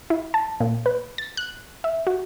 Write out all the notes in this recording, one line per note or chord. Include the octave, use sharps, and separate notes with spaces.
E4
A5
A#2
B4
A6
F#6
E5
F#4